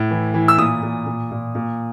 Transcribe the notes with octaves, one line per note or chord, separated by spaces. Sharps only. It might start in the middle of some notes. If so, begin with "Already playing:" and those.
Already playing: A2
E3
E3
E6
A#2 D#6
A#2
A#2
A#2
A#2